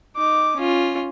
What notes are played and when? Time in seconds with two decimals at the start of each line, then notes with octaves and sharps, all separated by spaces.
0.16 D#4 D6
0.57 C#4 F4